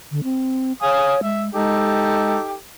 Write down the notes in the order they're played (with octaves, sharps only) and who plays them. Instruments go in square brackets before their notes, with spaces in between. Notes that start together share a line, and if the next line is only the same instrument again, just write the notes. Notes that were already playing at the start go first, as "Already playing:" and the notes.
[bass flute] D3
C4
[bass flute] C#5 [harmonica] F5 G#5 D#6
[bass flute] G#3 [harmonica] E5
[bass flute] G#3 [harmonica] D#4 G4 A4